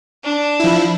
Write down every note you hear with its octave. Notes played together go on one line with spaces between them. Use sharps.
D4
F3 E4